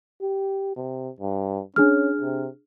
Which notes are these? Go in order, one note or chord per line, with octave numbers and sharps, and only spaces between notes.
G4
C3
G2
C#4 D4 G#4 F6
C3